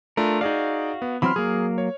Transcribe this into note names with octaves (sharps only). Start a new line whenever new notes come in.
A3 D4 F4 A#4
D#4 F#4 G#4 D5 F5
B3
E3 F#3 C4 B5 C6 F6
F#3 A#3 G#4
C#5